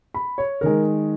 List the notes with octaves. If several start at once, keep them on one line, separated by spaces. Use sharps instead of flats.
B5
C#5
D#3 G#3 A#4